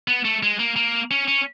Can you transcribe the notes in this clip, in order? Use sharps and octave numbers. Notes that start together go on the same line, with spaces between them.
B3
A3
G#3
A#3
A#3
C#4
C#4